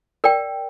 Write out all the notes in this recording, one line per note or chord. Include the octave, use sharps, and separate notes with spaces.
A#4 D5 G5